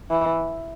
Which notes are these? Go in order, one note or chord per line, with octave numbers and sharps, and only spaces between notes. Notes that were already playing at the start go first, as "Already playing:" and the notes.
E3